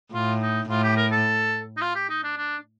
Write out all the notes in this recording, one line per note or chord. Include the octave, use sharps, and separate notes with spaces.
A2 F4
D#4
A2 F4
G4
A#4
A4
D#4
F4
G4
D#4
D4
D4